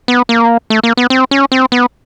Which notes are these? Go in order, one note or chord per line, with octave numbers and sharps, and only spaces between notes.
B3
A#3
A3
A#3
B3
C4
C#4
C4
B3